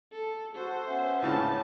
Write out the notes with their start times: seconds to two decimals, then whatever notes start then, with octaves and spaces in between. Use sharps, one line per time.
0.12 A4
0.55 F#4 A4 C5
0.88 B3 C#4 E5
1.22 C#2 A2 C#3 A5